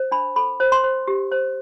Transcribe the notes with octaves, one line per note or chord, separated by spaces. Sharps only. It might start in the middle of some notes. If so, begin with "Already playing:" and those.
Already playing: C5
D4 B5
A4 B5
C5
C6
C5
G4
C5